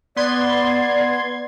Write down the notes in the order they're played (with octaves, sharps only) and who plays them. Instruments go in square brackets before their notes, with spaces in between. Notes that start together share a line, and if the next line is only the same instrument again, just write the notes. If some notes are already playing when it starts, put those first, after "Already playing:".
[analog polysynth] B3 C6 G#6 [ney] D5